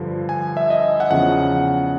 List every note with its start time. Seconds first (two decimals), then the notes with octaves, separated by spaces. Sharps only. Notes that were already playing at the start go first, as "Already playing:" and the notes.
Already playing: G2 D3 F3
0.29 G#5
0.57 E5
0.70 D#5
1.00 F#5
1.11 E2 C#3 F3 F#5